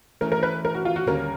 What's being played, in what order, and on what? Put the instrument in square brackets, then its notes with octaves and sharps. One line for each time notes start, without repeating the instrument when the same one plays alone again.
[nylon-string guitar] E3 A3 C#4 [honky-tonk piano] A#4
[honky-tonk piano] A#4
B4
A#4
F#4
F4
F#4
[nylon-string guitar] D#2 D3 G3 A#3 C#4 [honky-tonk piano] A#4